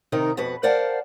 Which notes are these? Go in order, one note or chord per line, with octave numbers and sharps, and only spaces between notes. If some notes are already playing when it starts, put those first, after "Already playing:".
C3 D#3 D#4 A#4
F2 B2 F#4 B4
A#4 C5 D5 F5 F#5 A5